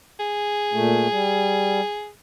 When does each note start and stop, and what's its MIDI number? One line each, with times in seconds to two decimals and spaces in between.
0.19 2.09 68
0.73 1.07 46
0.73 1.07 57
1.11 1.81 55